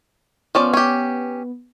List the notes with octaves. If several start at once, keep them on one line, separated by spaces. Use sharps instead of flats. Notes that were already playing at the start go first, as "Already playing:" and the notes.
F3 B3 C#4 D5
C#4 G4